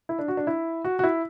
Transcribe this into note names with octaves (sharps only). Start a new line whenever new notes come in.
E4
D4
F#4
D4
E4
F#4
F#4
E4